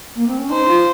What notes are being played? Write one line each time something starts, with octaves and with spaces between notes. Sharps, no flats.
A#3
C4
C#4
D#4 C5
D#4
F4